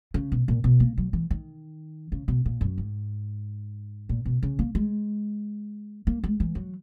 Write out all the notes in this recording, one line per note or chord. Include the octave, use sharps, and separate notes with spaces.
C#3
B2
A#2
B2
A#3
F#3
E3
D#3
C#3
B2
A#2
F#2
G#2
A#2
B2
C#3
A#3
G#3
A#3
G#3
E3
F#3